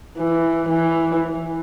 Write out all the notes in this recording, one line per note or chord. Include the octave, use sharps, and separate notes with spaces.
E3
E3